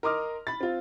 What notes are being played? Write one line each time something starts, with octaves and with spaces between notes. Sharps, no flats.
A#4 D#5 C6 D6 D#6 F6
B5 A6
C4 F4